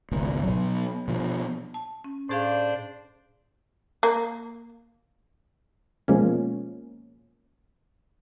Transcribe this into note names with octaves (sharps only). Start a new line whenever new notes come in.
G#1 C#2 B2
B2 F#3
B2 F3
A5
C#4
A2 D4 G#4 C5 D5 F5
A#3
B2 F3 G#3 A#3 C#4